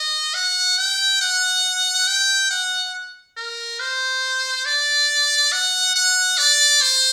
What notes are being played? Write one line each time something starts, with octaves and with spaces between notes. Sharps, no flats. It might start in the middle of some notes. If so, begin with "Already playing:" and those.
Already playing: D#5
F#5
G5
F#5
G5
F#5
A#4
C5
D5
F#5
F#5
D5
C5